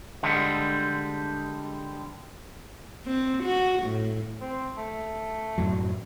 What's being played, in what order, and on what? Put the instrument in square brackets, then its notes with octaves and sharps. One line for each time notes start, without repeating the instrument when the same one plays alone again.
[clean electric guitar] D3 G3 G#3
[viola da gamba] C4
F#4
A2
[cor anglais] C4
A3
[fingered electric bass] F#2 A2 F#3